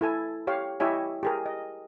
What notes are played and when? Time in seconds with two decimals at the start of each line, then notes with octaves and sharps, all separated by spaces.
0.01 E4 A4 G#5
0.47 G4 C#5 F5
0.80 E4 G4 C#5 D#5 E5 G#5
1.23 G4 G#4 A#4
1.46 D#5